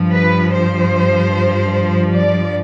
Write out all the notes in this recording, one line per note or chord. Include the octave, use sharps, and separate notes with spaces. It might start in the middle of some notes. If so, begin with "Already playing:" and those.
Already playing: G2 F3
B4
C5
D5